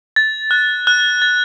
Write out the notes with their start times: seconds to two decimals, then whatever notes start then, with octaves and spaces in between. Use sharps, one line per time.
0.16 A6
0.51 F#6
0.87 F#6
1.22 A6